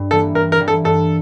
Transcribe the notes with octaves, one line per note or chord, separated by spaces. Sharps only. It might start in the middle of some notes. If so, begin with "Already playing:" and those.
Already playing: G2
E3 G3 A#3 A4
G2 A#4
A#4
E3 G3 A#3
A4
G2 A4